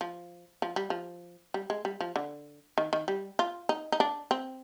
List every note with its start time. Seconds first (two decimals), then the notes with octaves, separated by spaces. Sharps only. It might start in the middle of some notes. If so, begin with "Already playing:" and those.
0.01 F3
0.62 F3
0.76 G3
0.90 F3
1.54 G3
1.70 G#3
1.85 G3
2.01 F3
2.16 D3
2.78 D#3
2.93 D#3
3.08 G3
3.39 F4
3.69 D#4
3.92 D#4
4.00 D4
4.31 C4